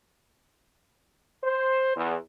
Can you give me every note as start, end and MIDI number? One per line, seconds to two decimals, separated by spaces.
1.43 1.92 72
1.96 2.16 40